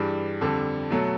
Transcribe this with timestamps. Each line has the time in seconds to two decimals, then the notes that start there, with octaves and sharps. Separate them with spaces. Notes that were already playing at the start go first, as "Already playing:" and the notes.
Already playing: G2 E3 G3 G#4
0.41 F2 D3 G3 A4
0.90 B2 F#3 A3